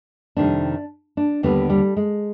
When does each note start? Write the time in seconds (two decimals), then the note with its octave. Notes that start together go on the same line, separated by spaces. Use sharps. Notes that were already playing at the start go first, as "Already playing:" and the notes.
0.36 F2 C3 D#3 G3 D4
1.17 D4
1.43 D#2 D3 G3 B3
1.70 G3
1.97 G#3